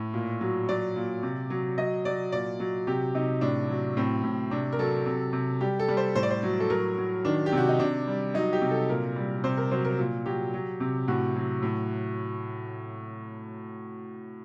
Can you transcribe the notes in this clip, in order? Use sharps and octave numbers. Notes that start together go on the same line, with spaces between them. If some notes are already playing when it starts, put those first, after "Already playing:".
Already playing: A2
A#2
F#3
F#3 D5
A#2
C3
F#3
F#3 D#5
F#3 D5
A#2 D5
F#3
C3 G4
C3 D#4
A2 D4
F#3
A2 C4
A2
C3 D4
A#4
F#3 A4
C3
C3
G3 G4
A4
G3
C5
A2 C5
D5
C5
F#3
A4
F#3 A#4
F#3
D#3 D4
G4
C3 F#4
D#4
C3 D4
G3
F#3 D#4
G4
C3
A4
A#2 A#4
G3
C3 C5
A#4
F#3 C5
A#4
A#2
F#3 G4
F#3
C3
A2 F#4
F#3
A2